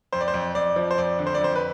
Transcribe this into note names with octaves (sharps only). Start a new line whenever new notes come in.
F2 C5
D5
C5
F2
F2 D5
F3
C5
F2 D5
D3
C5
D5
F2 C5
B4